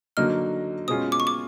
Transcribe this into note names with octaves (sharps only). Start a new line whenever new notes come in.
D3 F#3 A#3 D#4 F6
B2 G#3 C#4 F4 D#6
D6
C#6
D6